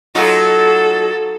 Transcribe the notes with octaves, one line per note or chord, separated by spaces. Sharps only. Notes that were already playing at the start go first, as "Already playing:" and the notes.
F#3 D#4 F4 A4